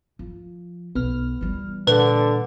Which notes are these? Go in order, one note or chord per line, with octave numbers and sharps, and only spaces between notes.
F3
B1 B3 F6
E3 G3
A#2 D3 B4